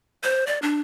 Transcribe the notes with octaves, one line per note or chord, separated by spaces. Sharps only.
C5
D5
D4